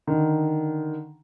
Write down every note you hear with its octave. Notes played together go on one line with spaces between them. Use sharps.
D3 D#3